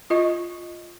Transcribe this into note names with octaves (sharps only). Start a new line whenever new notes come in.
F4 D#5 C#6